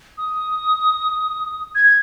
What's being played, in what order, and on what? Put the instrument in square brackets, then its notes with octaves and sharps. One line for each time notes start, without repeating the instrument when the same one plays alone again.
[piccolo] D#6
G#6